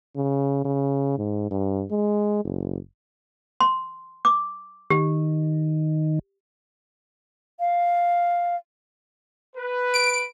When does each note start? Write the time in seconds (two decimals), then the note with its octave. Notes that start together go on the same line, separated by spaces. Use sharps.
0.16 C#3
0.65 C#3
1.18 G#2
1.51 G2
1.91 G#3
2.44 F#1
3.61 C6
4.25 D6
4.90 D#3 G4
7.60 F5
9.56 B4
9.94 D7